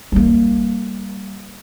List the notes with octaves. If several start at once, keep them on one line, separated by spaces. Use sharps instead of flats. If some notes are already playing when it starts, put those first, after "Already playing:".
G3 A#3